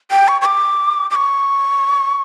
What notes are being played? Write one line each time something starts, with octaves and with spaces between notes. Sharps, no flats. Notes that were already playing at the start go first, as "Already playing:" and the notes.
G5
C#6
C#6
D6
D6
C#6